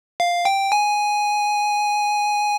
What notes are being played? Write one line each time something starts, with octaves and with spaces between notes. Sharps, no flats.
F5
G5
G#5